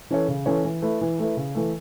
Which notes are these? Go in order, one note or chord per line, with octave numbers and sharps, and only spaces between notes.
E3 C#4 A4 C#5
C#3
E3 C#4 A4 C#5
E3
A3 E4 B4
E3
A3 E4 B4
C#3
E3 A3